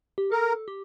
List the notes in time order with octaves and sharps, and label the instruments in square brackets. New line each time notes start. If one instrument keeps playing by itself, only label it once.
[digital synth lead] G4
[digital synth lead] A4 [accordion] A#4
[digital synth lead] G4